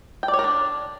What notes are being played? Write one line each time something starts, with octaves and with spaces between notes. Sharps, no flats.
G5
D5
C#5
A#4
D4